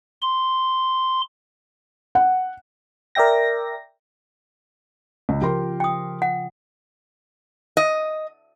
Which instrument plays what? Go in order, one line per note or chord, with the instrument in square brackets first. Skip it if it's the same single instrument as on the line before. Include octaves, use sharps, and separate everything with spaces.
[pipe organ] C6
[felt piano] F#5
[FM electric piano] A#4 D5 E5 G5 A#6
[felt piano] C#2 [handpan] C#3
[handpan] F3 [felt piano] G4 A#4 C6
[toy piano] G5 D#6
F#5
[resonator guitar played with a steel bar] D#5